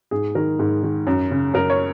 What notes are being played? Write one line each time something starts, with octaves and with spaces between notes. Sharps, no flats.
G#2 G#4
D#3 A#4
G#2
D#3
F#2
C#3
F#2 A#4
C#5